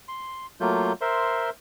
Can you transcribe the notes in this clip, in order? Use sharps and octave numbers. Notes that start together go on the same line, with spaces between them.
C6
F#3 A3 A#3 F4 G6
A#4 C5 E5 C6